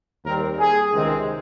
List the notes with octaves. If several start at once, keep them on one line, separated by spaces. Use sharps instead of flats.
D#2 D#3 G3 C4 A#4
G#4
C#2 C3 D#3 G#3 C4